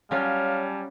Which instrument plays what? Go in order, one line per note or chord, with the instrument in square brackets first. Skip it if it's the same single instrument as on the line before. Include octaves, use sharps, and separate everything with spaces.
[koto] F#3 C#4 F4 [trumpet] G3 [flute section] C#5 G#5 A5 [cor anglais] F5